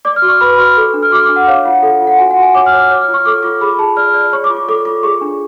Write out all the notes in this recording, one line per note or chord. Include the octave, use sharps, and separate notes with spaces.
D5 D6
F6
F#4
C#6
B4 B5
F#4 F6
A4
D4
F6
F#4 D6
D6
D4
F#5
C#5 F5
F4 F#5
A4
F4
F#5
F#4 G#5
F#5
F#4
G#5
C#5 D6
F6
C#5
D6
C#5
F6
F4
C#6
A4 D6
F4 D6
G#4 B5
G#4 A5
D5 F6
D5
C#5 C#6
D6
F4
D6
A4 D6
F4 D6
G#4 C#6
D4